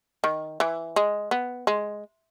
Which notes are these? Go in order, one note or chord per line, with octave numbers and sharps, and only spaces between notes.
D#3
E3
G#3
B3
G#3